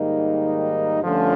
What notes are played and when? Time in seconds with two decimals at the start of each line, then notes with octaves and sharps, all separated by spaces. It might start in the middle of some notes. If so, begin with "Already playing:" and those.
Already playing: G#2 D#3 G3 A#3 D#4
1.01 G2 D3 F3 A3 C#4